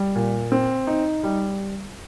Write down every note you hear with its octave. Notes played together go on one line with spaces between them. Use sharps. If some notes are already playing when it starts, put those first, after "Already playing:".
Already playing: G3
A#2
C4
D#4
G3